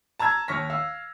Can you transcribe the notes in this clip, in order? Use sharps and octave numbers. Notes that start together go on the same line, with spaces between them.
A5 A#5 E6 G#6 A6
D#2 C#5 C#6 F6 A#6 B6
F5 E6